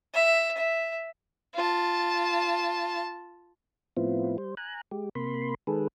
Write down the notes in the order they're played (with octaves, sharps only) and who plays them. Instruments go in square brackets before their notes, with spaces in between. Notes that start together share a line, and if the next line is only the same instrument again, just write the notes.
[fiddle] E5
E5
[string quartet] F4 A5
[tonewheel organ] A2 F3 B3 C4 E4 F4
G3 C5
G#5 A#5 F#6
G#3 G4
C3 A#3 B5 C6
D#3 G#3 G#4 A4 B4